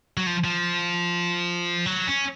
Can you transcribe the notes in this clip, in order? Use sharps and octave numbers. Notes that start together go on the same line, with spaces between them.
F#3
F3
F3
F#3
C#4